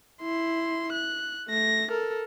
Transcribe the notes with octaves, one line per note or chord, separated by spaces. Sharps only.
E4 C6
F#6
A3 A#6
A4 A#4